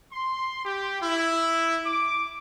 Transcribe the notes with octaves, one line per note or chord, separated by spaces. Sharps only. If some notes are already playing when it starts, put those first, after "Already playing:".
C6
G4
E4
D6